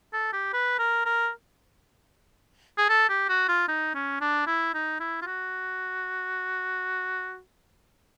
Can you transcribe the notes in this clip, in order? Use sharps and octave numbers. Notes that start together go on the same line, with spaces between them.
A4
G4
B4
A#4
A#4
G#4
A4
G4
F#4
F4
D#4
C#4
D4
E4
D#4
E4
F4
F#4